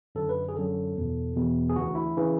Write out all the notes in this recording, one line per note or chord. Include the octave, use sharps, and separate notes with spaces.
F#2 D3 A4
B4
G#4
F#2 D3 A4
E2 B2
E2 B2
G#4
D2 C#3 E3 F#4
E4
C#3 E3